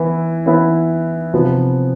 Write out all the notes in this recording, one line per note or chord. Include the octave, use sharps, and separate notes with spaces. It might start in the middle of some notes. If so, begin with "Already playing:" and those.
Already playing: E3 B3 E4
E3 B3 E4
C3 F3 B3